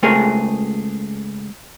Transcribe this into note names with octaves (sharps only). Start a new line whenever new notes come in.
C#2 A3 C4 G#4 A#4 G#5